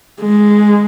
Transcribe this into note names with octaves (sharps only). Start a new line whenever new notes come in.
G#3